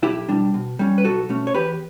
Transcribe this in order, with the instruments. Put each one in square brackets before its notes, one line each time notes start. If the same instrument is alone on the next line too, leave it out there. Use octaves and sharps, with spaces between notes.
[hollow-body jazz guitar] B1 E4 G4
B2 G3 D4
B2
G3 C#4
B4
B1 F#4 A4
B2 A3 C#4
C#5
E2 G4 B4